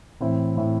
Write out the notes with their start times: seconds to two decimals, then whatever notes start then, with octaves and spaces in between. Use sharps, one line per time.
0.20 A2 E3 C4 E4
0.56 A2 E3 C4 E4